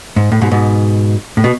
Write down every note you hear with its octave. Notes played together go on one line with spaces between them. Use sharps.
G#2
A2
G#2 B2
G#2 B2
A2
B2